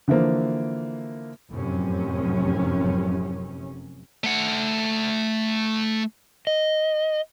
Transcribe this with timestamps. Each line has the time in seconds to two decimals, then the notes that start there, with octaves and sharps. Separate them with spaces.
0.08 D3 E3 F3 A#3
1.51 F1 F#2 A2 C3 C#4
4.24 A3 F#5
6.47 D#5